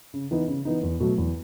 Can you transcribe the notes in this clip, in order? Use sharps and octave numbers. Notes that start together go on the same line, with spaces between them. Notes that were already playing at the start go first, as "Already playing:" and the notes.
C#3
E3 B3 D#4
C#3
E3 B3 D#4
E2
B2 F#3 A3
E2